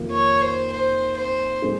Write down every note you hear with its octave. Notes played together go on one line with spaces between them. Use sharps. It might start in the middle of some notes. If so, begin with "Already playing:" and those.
Already playing: F2 C3 D#3 A#3 F4
C#5
C5
C5
C5
A#2 G#3 C4 D#4 G#4